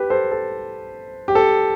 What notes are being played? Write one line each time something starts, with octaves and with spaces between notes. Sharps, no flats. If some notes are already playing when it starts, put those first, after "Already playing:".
Already playing: G4 B4
A4 C5
A4
G4
A4